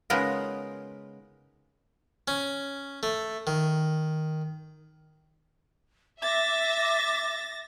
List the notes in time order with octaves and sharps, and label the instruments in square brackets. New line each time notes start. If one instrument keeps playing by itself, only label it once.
[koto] C#3 G#3 B3 D#4 F4 A#4
[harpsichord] C#4
A3
D#3
[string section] E5 [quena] D6 [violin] A6 A#6